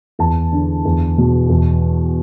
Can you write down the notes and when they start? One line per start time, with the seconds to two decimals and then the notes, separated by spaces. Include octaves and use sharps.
0.19 E2 A5
0.53 D3
0.85 E2
1.18 B2
1.50 E2